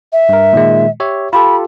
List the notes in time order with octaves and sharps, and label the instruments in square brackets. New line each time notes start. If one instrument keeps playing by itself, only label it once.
[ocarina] E5
[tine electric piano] G2 A#4
A#2 D#3 G#3
G4 C#5 E5
[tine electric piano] F4 G4 A4 [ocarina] B5